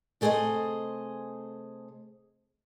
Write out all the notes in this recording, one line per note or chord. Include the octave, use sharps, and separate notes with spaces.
C3 A3 G#4 A4 C5 D#5